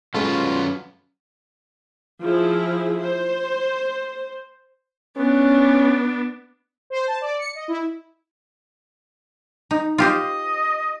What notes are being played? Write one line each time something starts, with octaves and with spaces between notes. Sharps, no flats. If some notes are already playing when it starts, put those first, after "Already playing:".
F#3 G#3 C#4 F4 A4 B4
F3 E4 G#4
C5
B3 C#4 D4
C5
A5
D5
C#7
D#5
E4
D#4
F4 G4 C5 D#5